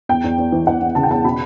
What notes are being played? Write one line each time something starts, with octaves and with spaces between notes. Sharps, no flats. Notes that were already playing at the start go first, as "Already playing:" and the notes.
E2 G5
E2
E2
E3
E2 F#5
E2
C#3 A5
G5
E2 A5
B2 B5